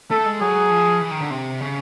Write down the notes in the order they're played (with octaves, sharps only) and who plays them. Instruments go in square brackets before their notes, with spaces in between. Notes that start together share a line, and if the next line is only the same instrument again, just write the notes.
[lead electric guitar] A3 [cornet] A4
[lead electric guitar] G#3
[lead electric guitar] F#3 [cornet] G#4
[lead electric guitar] F3
E3
D#3
D3
C3
C#3